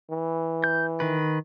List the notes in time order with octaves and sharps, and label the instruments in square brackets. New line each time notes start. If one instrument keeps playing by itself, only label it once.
[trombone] E3
[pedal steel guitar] G6
D#3 B4